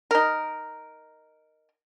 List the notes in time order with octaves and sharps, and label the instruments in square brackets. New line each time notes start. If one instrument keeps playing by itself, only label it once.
[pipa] D#4 A#4